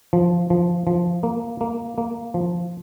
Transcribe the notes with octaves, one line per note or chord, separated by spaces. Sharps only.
F3
F3
F3
A#3
A#3
A#3
F3